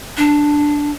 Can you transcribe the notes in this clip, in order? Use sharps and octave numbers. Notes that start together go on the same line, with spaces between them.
D4